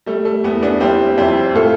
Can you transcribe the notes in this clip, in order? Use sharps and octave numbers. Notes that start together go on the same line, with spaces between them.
G3 A3
A3
E2 B3
B3 D4
G3 C4 E4
F2 C4 E4
A2 F4 A4